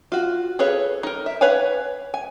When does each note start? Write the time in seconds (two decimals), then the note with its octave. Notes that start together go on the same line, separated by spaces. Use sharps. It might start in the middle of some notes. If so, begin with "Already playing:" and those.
0.12 F4 F#4
0.59 G#4 A4 B4 C#5 F5
1.03 D#4 A#4
1.26 E5
1.41 B4 C#5 F5 F#5 G#5
2.14 G#5